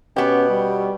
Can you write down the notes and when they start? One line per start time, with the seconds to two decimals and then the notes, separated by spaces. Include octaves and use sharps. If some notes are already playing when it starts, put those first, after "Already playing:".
0.16 B2 B3 C#4 G4
0.49 G3